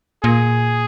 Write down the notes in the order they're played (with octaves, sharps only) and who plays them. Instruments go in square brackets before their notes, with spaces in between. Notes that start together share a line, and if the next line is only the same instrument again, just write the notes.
[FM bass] A#2 [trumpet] G#4